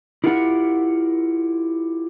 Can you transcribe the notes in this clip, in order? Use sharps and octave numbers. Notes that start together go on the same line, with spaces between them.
E4 F4 G4 A#4 F#5